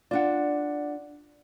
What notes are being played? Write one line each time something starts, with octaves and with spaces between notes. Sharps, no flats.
D4 F4 D5 F#5